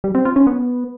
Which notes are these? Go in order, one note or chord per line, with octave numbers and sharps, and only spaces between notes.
G3
C4
F4
C#4
B3